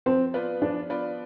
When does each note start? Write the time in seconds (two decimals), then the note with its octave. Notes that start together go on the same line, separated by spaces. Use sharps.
0.06 F3 C4
0.34 B3 F4 B4 D5
0.62 F3 D4
0.90 B3 F4 B4 D5